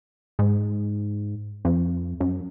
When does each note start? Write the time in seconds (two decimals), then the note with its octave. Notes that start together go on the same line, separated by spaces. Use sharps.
0.39 G#2
1.65 F2
2.20 F#2